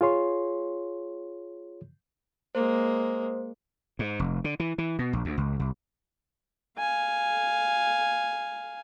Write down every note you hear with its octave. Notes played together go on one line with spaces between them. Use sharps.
F4 G#4 C#5 C6
G#3 A#3 C5
G#2
F1
D3
E3
E3
B2
A#1
D2
C#2
C2
F5 G#5